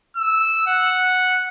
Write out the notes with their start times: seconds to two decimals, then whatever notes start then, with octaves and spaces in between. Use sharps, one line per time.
0.16 E6
0.67 F#5